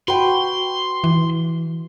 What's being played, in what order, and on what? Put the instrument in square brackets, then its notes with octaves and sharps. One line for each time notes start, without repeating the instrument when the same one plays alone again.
[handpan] F#4 [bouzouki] B4 G5 [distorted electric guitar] C6
[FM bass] E3